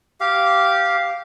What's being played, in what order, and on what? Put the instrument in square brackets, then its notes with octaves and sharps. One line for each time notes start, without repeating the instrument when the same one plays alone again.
[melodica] G4 F5